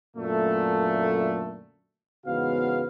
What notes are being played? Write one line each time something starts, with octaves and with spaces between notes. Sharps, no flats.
F#2 A#2 D3 A3
E2 G#2 C#3 B3 F#4 F5